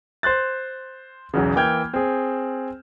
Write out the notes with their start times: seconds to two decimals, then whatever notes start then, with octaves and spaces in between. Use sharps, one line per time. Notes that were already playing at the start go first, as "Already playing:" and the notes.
0.23 C5 C6 F#6 A6
1.34 B1 E2 C#3
1.56 E3 A#3 G5 F6 G6 G#6
1.94 C4 G#4